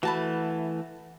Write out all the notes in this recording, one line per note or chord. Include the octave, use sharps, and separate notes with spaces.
E3 A3 F#4 A5 B5